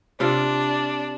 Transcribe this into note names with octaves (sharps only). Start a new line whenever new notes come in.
C3 D4 F4 D5